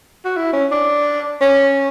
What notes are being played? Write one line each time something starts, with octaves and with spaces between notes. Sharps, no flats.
F#4
E4
C#4
D4
C#4